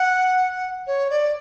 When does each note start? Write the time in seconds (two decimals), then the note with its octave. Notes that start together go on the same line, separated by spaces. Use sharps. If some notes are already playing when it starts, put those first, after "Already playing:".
Already playing: F#5
0.87 C#5
1.10 D5